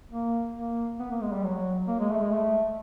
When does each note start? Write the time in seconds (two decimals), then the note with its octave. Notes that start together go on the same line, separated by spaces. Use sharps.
0.11 A#3
0.56 A#3
0.99 B3
1.11 A#3
1.22 G#3
1.33 G3
1.43 F#3
1.88 A#3
1.99 G#3
2.10 A3
2.21 G#3
2.31 A3